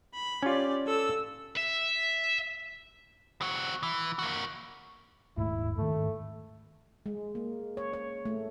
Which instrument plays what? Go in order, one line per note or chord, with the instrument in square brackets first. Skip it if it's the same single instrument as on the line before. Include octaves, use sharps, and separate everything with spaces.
[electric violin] B5
[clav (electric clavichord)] C#4 F4 [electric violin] G4 D5
[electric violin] A4 E6
[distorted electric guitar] E5
[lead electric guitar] C4 F#4
E3
A#3 F#4
[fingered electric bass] D#1 G#2 A3 [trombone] E4
[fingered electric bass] G#2 D#3 [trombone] A3
[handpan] G#3
A#3
C#5
C#5
A3